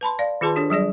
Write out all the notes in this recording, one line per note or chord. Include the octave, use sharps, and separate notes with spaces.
B4 A5 B5 C6
D5 F5
D#3 F4 G#4 B4 A5 C6
D4 G4 A4 C#5
F#3 G3 G#4 D5